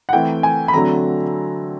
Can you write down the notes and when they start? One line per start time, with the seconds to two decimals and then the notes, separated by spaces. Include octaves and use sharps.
0.09 F#5
0.13 E3 A3 C4 G5
0.43 G#5
0.68 B5
0.73 D3 F#3 A3 C4 A#5